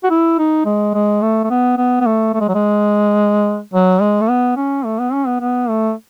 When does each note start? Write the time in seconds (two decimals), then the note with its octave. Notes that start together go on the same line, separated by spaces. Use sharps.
0.04 F#4
0.10 E4
0.39 D#4
0.66 G#3
0.94 G#3
1.22 A3
1.44 A3
1.50 B3
1.77 B3
2.01 B3
2.06 A3
2.34 A3
2.40 G#3
2.48 F#3
2.55 G#3
3.73 F#3
4.01 G#3
4.21 A3
4.29 B3
4.56 C#4
4.85 A3
4.99 B3
5.13 C#4
5.26 B3
5.40 B3
5.69 A3